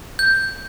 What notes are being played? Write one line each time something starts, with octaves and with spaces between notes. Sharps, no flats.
G6